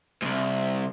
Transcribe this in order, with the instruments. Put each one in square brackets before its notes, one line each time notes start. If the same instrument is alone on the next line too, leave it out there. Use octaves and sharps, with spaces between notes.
[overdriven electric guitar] C2 G#2